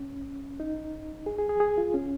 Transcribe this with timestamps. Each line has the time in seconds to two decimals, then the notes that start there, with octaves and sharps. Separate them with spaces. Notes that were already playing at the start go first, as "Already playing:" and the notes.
Already playing: C#4
0.60 D#4
1.26 G#4
1.39 G#4
1.49 G#4
1.60 G#4
1.78 F4
1.94 C#4